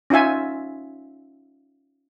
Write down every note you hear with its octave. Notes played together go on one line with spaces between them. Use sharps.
C#4 D#4 F4 E5 G#5